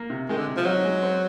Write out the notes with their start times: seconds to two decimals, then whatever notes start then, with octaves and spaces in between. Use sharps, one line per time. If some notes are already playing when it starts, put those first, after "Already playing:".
Already playing: A#3
0.10 C3
0.29 D#3 G#3
0.37 D3
0.47 C3
0.57 F3
0.65 F#3 D#4
0.85 G#3
1.03 C4